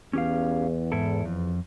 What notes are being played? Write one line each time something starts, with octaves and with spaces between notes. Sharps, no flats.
E2 C#4 G4 F5
G#2 E4 A4
F2